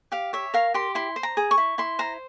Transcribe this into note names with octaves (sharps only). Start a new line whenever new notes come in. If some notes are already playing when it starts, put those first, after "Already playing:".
G4 F5
C#5 E5
A#4 F5
G4 C6
E4 C6
C5
A#5
G#4
C#6
E4
E4 C6
C5 A#5